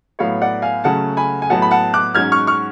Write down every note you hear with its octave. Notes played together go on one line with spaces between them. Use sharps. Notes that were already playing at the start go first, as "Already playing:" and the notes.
A2 F#3 B3 C#5 F5
D5 F#5
F5 G#5
C#3 F#3 A3 C#4 F#5 A5
G#5 B5
G#5
A2 F#3 B3 F#5 A5
B5
F#5 A5
D6 F#6
G#2 F#3 C#4 F6 G#6
C#6 F6
C#6 F6